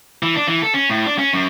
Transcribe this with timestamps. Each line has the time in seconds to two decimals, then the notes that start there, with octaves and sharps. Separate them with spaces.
0.23 E3
0.36 D4
0.47 E3
0.62 A4
0.74 C#4
0.90 A2
1.06 D4
1.19 C#4
1.34 F#2